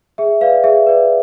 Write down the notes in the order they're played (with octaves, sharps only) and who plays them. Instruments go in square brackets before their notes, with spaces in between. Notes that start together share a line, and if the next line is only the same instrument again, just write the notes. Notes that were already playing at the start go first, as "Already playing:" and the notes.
[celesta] G#4 E5
B4 D5 F5
G#4 E5
B4 D5